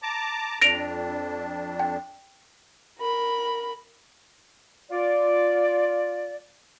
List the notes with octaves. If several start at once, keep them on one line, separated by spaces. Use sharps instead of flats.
A5 A#5 D6
F2 D4 A#6 D7 F7
G5
A#4 B5
F4 D5